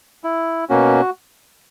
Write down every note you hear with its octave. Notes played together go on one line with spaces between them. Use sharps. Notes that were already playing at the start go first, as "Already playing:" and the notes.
E4
B2 A#3 C#4 F#4